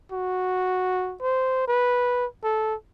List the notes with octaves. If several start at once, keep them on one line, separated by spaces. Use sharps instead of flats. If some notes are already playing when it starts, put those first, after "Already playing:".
F#4
C5
B4
A4